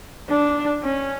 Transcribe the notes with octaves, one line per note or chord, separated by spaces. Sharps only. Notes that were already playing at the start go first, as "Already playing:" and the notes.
D4
C#4